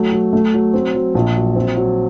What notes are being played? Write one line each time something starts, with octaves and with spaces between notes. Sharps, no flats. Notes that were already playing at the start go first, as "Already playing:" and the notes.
Already playing: F#3 A3
F#3
A3
F#3
C4
F#3
A#1
F#3
C4
F#3